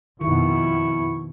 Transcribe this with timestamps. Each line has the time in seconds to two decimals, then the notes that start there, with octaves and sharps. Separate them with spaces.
0.21 F2 B2 D#3 E4 C#6